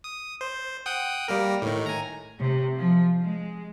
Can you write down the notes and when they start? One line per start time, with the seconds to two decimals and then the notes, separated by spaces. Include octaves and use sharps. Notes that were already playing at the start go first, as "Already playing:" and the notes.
0.04 D#6
0.41 C5
0.86 F#5 G5 D#6
1.28 G3 A#3 A#4
1.62 A2 D#3
1.86 G#5 A#5
2.38 C3
2.77 F3
3.20 G#3